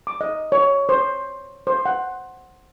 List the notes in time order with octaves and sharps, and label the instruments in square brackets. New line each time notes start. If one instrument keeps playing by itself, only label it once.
[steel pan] D6
D#5
C#5
C5
C5
F#5